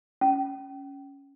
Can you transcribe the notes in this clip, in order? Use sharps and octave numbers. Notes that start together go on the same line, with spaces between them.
C#4